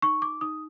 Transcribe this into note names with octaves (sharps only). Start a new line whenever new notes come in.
D#4 C#6
D6
D#4 D#6